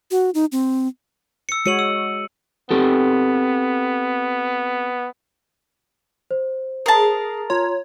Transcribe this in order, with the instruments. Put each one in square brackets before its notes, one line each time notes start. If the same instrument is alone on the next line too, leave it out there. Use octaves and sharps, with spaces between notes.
[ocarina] F#4
D#4
C4
[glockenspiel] E6 C#7
[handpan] G#3 F#4 C#5 [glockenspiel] C#7 D#7 F#7
[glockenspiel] E6
[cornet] B3 [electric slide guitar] C4 G4 A4
[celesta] C5
[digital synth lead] G#4 [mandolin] A#4 A5
[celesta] F4 A#5 C6 [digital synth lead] C#5